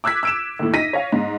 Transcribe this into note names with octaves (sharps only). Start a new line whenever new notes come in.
D6 E6 F#6 G#6 B6
E6 D7 E7
D#2 A2
D#4 A#6 B6 D#7
C#5 F5
G#2